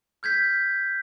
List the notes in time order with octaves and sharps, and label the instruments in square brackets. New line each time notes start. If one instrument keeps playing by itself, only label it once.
[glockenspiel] F6 G6 G#6 B6